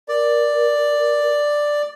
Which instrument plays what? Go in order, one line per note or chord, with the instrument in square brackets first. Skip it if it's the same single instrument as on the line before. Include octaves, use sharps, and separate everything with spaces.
[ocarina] A#4 [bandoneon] D5